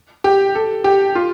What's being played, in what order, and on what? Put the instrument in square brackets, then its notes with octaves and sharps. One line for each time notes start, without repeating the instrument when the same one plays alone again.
[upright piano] G4
A4
G4
F4